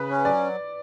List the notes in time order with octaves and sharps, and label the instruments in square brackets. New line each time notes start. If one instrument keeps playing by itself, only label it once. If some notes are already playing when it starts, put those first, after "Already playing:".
Already playing: [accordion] C#3 [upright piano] B4
[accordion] C#4
[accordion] F#3 [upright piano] D5